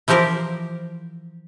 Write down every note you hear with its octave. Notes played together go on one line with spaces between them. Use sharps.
E3 F3 G4 A#4 C5